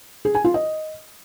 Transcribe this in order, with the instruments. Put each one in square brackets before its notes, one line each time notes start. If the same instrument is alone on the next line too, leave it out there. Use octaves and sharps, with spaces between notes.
[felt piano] G#4
G#5
F4
D#5